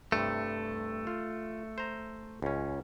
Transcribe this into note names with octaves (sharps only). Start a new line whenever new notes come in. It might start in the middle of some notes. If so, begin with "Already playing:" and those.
G2 C3 A3
F4
C5 A#5
C#2 C#4